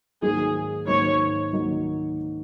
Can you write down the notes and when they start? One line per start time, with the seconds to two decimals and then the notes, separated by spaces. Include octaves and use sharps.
0.22 G#2 D#3 F#3 A#3 D#4 G#4
0.87 G#2 D#3 F#3 A#3 D#4 C#5
1.53 D#3 F#3 A#3 D#4